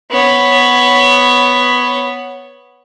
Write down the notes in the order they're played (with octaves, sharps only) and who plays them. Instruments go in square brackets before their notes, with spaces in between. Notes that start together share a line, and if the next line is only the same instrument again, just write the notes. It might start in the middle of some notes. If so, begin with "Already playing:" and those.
[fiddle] B3 C#5